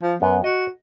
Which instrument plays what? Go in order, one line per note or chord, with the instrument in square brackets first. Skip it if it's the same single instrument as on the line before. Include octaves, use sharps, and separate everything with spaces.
[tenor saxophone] F3
[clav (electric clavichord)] F#2 [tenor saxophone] B3
[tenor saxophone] F#4 [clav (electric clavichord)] D#5